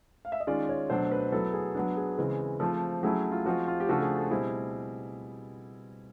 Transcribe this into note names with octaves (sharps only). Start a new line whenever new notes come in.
F5
E5
D#5
D#3 G#3 C#4 F4 D5
C#5
B2 F#3 A3 D4 C5
B4
F#3 B3 E4 A4
G#4
F#3 B3 D4
G#4
C#3 E3 G#3 C4
F3 A3 C4 F4
F#3 A3 C#4 E4 G#4
F4
F3 G#3 C4 F4 F#4
F4
G4
C#3 F3 A3 D4 F4 F#4
G#4
A4
B2 G3 C4 E4 G#4